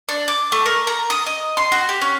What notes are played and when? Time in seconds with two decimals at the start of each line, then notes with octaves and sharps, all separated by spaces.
0.09 D4
0.28 D6
0.52 A3
0.66 A#4
0.87 A#5
1.10 D#6
1.26 D#5
1.57 C6
1.72 F#4
1.89 G4
2.02 C#4